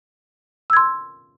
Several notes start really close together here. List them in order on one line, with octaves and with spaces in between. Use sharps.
E6 G#6 C6